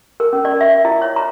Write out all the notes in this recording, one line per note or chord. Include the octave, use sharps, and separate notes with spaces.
A#4
C#4
D5
E5
E4
C#5
A#5